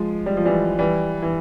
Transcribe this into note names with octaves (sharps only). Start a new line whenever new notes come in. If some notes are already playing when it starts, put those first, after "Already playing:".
Already playing: F3 G#3
G3
F3
E3 G3
E3 G3
E3